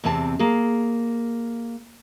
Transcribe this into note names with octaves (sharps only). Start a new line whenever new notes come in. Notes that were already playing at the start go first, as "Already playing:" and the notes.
E2 C3 C4 A5
A#3 G#4